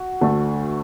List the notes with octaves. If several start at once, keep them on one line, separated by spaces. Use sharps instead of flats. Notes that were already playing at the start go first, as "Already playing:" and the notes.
Already playing: F#4
D2 D3 A3